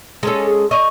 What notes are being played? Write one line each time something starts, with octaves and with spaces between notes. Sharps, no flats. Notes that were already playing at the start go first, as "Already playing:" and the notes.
G#3 C#4 A4
G#4
D#5 C#6